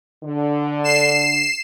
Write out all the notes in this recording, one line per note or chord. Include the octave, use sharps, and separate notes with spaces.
D3
C7 E7